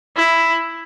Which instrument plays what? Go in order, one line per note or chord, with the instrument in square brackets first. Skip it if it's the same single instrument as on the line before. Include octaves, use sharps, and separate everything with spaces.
[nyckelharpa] E4